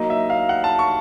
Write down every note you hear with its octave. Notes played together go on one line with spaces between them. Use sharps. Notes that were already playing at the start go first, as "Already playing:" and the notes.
Already playing: F#3 A#3 D#4 D#5
E5
F5
F#5
A5
C#6